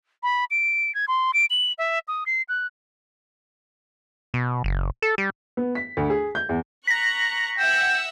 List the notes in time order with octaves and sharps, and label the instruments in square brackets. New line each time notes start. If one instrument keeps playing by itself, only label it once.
[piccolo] B5
D7
G#6
C6
D7
F#7
E5
D#6
C7
F#6
[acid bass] B2
F#1
A4
G3
[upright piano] B3
B6
D2
G#4
G6
E2
[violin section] A#5 C#6 F#6 [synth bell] A#6 B6
[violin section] E5 F#5 E6 [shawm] G5